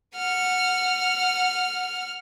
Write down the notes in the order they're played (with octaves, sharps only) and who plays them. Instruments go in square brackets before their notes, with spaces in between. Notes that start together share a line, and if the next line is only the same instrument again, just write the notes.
[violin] F#5 F6